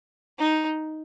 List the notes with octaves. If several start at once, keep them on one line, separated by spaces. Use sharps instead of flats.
D#4